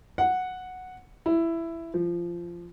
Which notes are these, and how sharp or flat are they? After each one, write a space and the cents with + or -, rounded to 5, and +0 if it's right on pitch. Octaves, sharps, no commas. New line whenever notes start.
F#5 -5
E4 +10
F3 -15